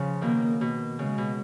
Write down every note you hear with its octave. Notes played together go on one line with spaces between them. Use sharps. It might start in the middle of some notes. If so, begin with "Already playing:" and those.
Already playing: C#3 F3
B2 D#3 A#3
B2
C#3 G#3
B2